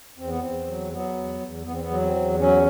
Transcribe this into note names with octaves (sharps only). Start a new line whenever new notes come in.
E2 C4
B3
E2 C4
F#3
F#3 B3
E2
E2
E2 B3
C4
B3
F#3
C4
E2
F#3 C#4